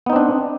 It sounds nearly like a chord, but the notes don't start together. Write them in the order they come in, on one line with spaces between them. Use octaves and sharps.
B3 D#4 C4 D4